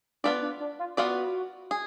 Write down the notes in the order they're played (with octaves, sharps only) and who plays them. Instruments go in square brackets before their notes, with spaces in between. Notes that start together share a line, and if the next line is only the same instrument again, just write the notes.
[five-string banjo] B3 F4 B4 D5 [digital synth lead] D4
[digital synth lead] D4
D4
F4
[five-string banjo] B3 F4 B4 D5 [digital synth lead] F#4
[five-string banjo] G#4